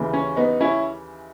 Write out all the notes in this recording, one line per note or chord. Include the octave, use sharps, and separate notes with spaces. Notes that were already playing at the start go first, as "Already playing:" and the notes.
Already playing: D#2 C#3 E3
C#4
B3 D#4
C#4 E4